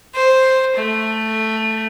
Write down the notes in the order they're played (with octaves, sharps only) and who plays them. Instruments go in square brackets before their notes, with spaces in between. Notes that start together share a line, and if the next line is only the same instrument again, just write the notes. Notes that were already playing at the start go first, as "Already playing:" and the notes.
[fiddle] C5
A3